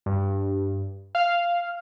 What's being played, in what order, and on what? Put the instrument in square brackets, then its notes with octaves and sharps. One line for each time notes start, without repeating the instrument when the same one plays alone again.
[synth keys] G2
F5